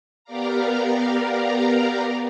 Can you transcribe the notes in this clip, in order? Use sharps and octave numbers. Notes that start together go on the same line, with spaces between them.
B3 G4 A#4 D5 F5 A#5